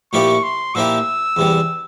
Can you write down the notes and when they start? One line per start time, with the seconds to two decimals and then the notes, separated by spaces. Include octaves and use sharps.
0.12 A#2 F3 A#3 E4 G4 C#6
0.43 C6
0.75 A#2 F3 A#3 E4 G4 E6
1.37 E2 C3 G3